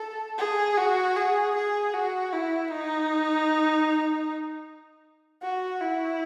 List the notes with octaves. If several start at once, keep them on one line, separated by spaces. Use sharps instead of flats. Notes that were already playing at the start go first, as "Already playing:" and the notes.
Already playing: A4
G#4
F#4
G#4
G#4
F#4
E4
D#4
F#4
E4